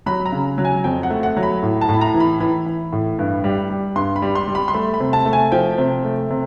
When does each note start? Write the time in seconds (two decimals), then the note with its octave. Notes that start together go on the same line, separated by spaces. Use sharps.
0.06 F#3 B5
0.26 A#5
0.32 C#3
0.58 F#3
0.65 G#5
0.84 F2 G5
1.03 F#5
1.10 A3
1.23 F#5
1.37 F#3
1.43 B5
1.63 A2
1.81 A5
1.89 A2 B5
2.01 A#5
2.14 E3
2.20 B5
2.40 E3 B5
2.66 E3
2.92 A2
3.19 G2
3.44 G3
3.70 G3
3.96 G2 C6
4.16 B5
4.22 G3
4.35 C6
4.48 G3
4.55 B5
4.68 C6
4.74 A3 B5
4.94 B5
5.00 C3
5.13 A5
5.26 A3
5.33 G#5
5.52 F3 G5
5.78 C3
6.05 A3
6.30 C3